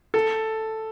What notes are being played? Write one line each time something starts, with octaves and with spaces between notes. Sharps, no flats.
A4